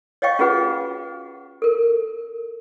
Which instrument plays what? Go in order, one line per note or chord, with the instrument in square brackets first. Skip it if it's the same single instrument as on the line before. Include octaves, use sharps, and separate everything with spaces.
[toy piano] C#5 D#5 F5 G5 C#6
C#4 F4 F#4 G#4 B4 F#5
A4 A#4